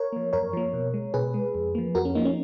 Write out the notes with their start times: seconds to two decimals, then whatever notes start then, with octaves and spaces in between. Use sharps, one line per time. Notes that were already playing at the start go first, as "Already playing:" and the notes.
Already playing: A#4 C#5
0.13 F3 A#3
0.33 F#2 A#4 C#5
0.53 F3 A#3
0.74 B2
0.94 G#3
1.14 B2 G#4 B4
1.34 G#3
1.55 F2
1.75 F3 A#3
1.95 F2 F#4 A#4
2.05 C#4
2.15 F3 A#3 D#4
2.25 C#4